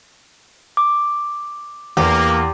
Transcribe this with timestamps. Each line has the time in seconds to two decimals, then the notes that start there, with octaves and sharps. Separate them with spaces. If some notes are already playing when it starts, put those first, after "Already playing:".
0.77 D6
1.97 E2 A#3 G4